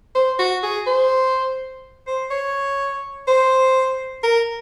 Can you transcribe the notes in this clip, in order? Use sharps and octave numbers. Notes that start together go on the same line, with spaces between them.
C5
F#4
G#4
C5
C5
C#5
C5
A#4